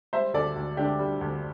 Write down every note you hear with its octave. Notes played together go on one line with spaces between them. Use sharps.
G3 C5 E5
D2 A4 D5
D2
D3 D4 G4
G3
D2